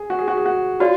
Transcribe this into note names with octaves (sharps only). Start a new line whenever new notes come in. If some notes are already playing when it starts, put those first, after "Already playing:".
Already playing: G#4
F#4
G#4
F#4
G#4
F#4
F4 F#4 D5